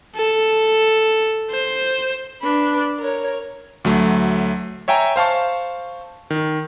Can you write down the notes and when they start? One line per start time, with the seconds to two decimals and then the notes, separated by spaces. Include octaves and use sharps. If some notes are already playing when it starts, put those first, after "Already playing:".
0.16 A4
1.51 C5
2.41 D4 B4 B5
2.99 A#4 C#5
3.85 D2 F#3 A3
4.88 C#5 E5 G5 G#5 A#5
5.16 C5 F5 A5 C#6
6.30 D#3